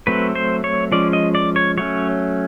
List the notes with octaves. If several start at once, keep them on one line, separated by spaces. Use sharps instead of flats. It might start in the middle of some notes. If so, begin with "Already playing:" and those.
F#3 A3 C4 B4
C5
C#5
F3 G#3 C#4 D5
D#5
D5
C#5
F#3 A3 C#4 C#5